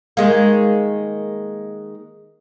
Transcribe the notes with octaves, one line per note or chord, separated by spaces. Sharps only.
D#3 G#3 A#3